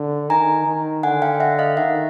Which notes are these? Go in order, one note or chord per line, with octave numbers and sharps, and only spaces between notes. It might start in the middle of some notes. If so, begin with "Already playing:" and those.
Already playing: D3
D#3 G#5 A#5
D#3
D3 F#5 G#5
F5 G5
E5 F#5
D#5 F5
D#3 E5 F#5